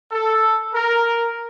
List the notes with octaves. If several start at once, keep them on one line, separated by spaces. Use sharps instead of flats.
A4
A#4